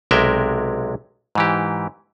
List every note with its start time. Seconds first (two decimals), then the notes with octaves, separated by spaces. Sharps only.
0.11 B1 C3 G#3 A#4 E5 G5
1.35 G#2 E3 G4